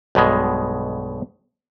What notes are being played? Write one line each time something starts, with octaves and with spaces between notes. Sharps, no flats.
B1 G2 B2 G#3